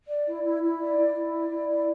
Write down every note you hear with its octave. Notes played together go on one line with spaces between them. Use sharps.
D5
E4
E4
E4
D5
E4
E4
D5
E4
D5